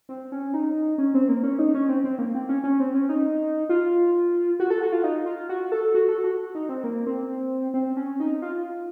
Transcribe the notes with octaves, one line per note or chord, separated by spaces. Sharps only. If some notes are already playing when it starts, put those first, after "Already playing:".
C4
C#4
D#4
C#4
C4
A#3
C#4
D#4
C#4
C4
C4
A#3
C4
C#4
C#4
C4
C#4
D#4
F4
F#4
A4
F#4
F4
D#4
F4
F#4
A4
F#4
A4
F#4
D#4
C4
A#3
C4
C4
C#4
D#4
F4